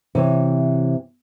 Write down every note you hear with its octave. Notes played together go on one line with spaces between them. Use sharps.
C3 E3 C#5